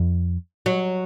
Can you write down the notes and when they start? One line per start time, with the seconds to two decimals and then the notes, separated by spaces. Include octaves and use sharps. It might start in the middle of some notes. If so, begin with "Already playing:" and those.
Already playing: F2
0.66 F#3